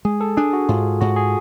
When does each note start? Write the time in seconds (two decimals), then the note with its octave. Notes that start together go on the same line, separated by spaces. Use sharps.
0.05 G#3 G#4
0.21 A4
0.37 D4 G#4
0.53 F#4
0.68 G#2 F4
1.01 G#2 F#4
1.16 G#4